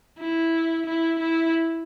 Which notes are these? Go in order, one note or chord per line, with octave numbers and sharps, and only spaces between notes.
E4
E4
E4